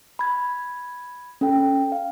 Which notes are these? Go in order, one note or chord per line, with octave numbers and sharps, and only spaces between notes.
B5 G#6
C#4 A4 G5
F5